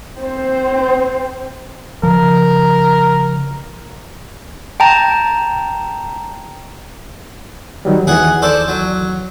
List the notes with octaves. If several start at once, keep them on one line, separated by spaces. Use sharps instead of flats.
C4 C5
C#3 F3 A#4
G5 A5 A#5
D#3 F#3 G3
D#2 E3 G#4 F#5 G#5
A4 C5 D5
F#3